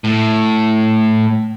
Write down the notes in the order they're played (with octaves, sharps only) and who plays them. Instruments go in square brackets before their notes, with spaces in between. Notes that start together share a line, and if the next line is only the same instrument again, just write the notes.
[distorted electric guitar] A2